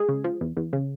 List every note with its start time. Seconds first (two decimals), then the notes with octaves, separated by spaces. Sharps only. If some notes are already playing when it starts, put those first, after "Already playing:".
Already playing: G#3 G#4
0.09 C#3
0.24 F3
0.41 E2
0.57 E2
0.73 C#3